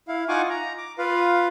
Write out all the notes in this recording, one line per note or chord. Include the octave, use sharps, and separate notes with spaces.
E4 F5
D#4 F4 F#5 G#5 C#6 D6
A#5
D6
F4 B4 F5